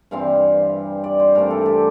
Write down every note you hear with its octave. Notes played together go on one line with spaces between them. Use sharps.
G2 E3 G3 C4 F5
D5
C5
G2 E3 A3 C4 A#4
A4
G4